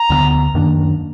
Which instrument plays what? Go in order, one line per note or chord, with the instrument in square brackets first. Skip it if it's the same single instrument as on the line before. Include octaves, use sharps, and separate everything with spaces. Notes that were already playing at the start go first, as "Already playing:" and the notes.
Already playing: [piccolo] A#5
[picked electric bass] D2 D3 F3 B3
F#2 D#3 A#3 D4